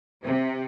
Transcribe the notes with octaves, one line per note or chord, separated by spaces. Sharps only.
C3